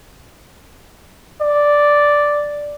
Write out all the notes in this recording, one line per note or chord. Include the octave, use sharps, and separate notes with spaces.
D5